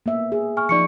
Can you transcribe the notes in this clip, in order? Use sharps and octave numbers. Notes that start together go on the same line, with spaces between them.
A#3 B3 E5
G#4
G#5 C#6 F6
F3 D#4 D5 C#6 C#7